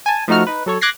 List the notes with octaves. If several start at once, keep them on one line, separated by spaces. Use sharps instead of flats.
G#5 A5
F3 A3 D#4 F#4 F6
D#4 B4
F#3 A4 C#5
D6 F#6 G#6 A#6 C7